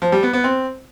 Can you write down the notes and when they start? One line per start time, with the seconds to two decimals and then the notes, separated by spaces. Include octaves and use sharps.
0.02 F3
0.12 G3
0.23 B3
0.33 B3
0.44 C4